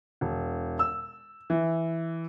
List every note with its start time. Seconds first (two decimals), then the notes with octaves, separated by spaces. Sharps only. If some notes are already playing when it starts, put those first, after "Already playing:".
0.21 E1
0.79 E6
1.50 E3